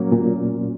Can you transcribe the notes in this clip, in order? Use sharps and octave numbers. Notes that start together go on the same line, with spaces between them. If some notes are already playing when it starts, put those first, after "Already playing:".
Already playing: A#2 F#3 A#3 C#4
A#2